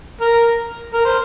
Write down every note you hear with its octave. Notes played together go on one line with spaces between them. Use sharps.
A#4
A#4
C5